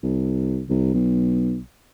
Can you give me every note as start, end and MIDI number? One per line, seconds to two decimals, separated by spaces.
0.03 0.62 36
0.69 0.93 36
0.94 1.58 35